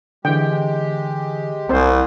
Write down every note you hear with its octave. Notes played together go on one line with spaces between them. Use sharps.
D3 E3 G#3 G4 G5
C2 C4 C5